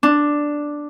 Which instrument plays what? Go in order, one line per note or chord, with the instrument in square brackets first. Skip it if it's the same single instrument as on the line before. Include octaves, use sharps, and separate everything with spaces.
[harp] D4